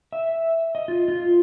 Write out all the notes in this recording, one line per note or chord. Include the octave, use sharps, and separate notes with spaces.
E5
D#5
F4
F4